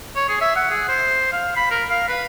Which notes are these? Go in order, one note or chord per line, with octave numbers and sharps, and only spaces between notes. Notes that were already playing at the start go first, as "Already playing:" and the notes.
C#5
G#4
E5
F#5
G#4
C5
F5
B5
A#4
F5
B4